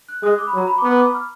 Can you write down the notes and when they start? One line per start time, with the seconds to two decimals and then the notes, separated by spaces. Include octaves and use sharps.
0.08 F#6
0.23 G#3 D#6
0.38 D6
0.47 B5
0.54 F#3
0.58 A#5
0.68 B5
0.78 D6
0.83 B3 B5
0.99 D6
1.14 F6